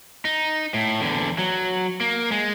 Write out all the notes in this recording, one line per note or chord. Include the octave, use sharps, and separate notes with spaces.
D#4
A2
E2 D3
F#3
A#3
G#3